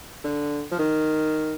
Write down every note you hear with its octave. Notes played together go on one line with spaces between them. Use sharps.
D3
F3
D#3